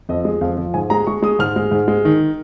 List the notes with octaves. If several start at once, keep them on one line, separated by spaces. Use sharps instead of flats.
F2 D#5
G#3
F2 F5
F3
G#2 G#5
G#3 A#5
G#3 C#6
G#3 D#6
G#2 F6
G#3
G#2
G#3
D#3